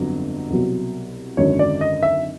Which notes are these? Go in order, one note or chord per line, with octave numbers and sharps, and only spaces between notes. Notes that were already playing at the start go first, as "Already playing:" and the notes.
Already playing: G1 F2 D3 F#3
C2 B2 F#3
G#1 F#2 D3 F#3 C#5
D5
D#5
E5